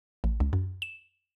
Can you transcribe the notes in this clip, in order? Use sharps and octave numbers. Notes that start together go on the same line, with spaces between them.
A1
C#2
F#2
E7